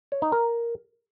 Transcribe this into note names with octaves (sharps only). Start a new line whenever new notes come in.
C#5
D#4
A#4